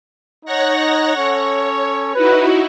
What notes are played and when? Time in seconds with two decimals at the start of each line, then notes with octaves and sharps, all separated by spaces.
0.45 D#4 C#5 F#5 A#6
1.16 C#4 A4 C#5 C#6
2.15 D#4 E4 F#4 B4